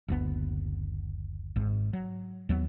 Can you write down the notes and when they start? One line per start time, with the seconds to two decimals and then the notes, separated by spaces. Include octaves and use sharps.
0.08 F#1 D2 B3
1.56 G#1 G#2
1.93 F#3
2.49 D#2 F#3 G#3 B3